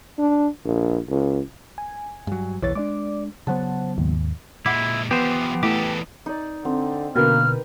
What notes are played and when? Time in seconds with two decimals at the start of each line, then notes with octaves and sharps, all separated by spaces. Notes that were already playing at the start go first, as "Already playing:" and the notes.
0.18 D4
0.65 A#1
1.08 C#2
1.78 G#5
2.27 G2 F#3
2.62 F#1 B1 E2 E3 C#5 A6
2.75 G#3 D4 D5 D6
3.47 C#3 F#3 B3 C5 F#5 A5
3.98 D#2 G#2
4.66 A#2 G#3 E4 F#5 D6
5.11 E3 F3 B3 G4 C5
5.63 E2 A3 E4 G4 A4 D6
6.26 D#4 D5
6.65 D3 C4
7.16 B2 D3 A#3 A#4 B4 G5 F6